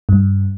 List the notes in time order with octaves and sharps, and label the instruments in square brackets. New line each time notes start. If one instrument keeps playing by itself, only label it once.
[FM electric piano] G2